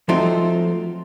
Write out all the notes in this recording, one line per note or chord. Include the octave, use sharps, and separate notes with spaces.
F3 F#3 A3 C4 D#4 F4